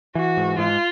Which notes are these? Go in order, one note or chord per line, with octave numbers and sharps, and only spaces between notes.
E3 F#4
G#2
G#2 F4